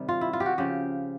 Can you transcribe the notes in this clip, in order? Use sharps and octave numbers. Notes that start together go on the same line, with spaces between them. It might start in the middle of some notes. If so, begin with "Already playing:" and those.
Already playing: C3 D#3 G3
F4
E4
F4
G4
F#4
C#3 F3 G4